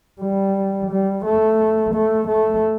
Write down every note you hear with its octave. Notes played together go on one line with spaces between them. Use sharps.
G3
G3
A3
A3
A3